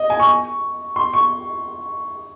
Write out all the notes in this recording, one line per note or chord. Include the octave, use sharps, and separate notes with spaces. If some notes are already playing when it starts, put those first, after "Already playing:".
Already playing: D#5
G#5
C#6
C6
C#6